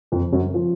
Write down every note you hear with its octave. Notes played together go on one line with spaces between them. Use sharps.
F2 F3
F#2 F#3
F3